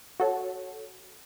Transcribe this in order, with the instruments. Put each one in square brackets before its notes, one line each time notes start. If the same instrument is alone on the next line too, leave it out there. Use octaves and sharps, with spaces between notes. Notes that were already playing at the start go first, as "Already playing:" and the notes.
[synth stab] F#4 A4 C#5